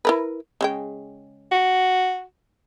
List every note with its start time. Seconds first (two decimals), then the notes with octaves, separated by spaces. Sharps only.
0.05 E4 A#4 B4
0.61 C#3 G#3 G5
1.52 F#4